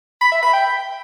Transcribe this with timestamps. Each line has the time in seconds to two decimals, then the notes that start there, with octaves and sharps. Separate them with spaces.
0.21 B5
0.32 E5
0.42 B5
0.53 G5